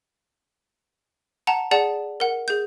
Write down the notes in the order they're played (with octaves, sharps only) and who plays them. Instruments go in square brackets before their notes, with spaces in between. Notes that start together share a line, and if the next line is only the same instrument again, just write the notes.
[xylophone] F#5 A5 A#5
G#4 D5 F#5 A5
A#4 F#5
G#4 G6